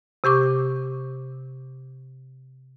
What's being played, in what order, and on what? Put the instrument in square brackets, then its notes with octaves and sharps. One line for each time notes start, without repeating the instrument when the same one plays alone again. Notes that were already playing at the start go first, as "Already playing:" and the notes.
[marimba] C3 G4 C#6 D6